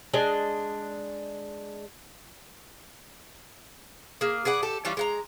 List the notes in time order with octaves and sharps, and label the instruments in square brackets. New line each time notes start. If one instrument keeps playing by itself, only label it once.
[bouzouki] G#3 D4 D#5
A#3 G#4
G#4 B4 D5 F#5
G4 A4
E3 G3 C#4 F4
G#3 F#5 A#5